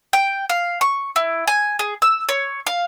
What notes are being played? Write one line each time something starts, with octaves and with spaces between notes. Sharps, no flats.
G5
F5
C#6
E4
G#5
G#4
E6
C#5
F5